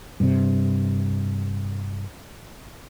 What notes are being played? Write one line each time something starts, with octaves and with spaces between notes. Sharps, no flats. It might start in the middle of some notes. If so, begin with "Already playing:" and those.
G2 C3